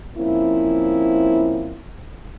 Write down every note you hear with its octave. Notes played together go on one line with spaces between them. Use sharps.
F3 A#3 C4 C#4 E4